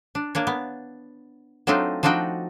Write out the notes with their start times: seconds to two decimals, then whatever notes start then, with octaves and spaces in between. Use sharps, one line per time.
0.15 D4
0.35 A#3 D4 C#5
0.47 B3
1.67 F#3 A3 C4 D4 D#4 F4
2.03 F3 C4 D4 D#4 F#4 G5